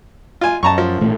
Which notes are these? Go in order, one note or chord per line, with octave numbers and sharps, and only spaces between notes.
F4 G#5
F#2 A5 A#5 C#6
F3
A1 A#2 A3